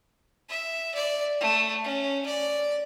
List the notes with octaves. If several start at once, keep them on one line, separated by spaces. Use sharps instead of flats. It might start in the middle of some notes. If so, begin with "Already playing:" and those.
E5
D5
A3
C#4
D5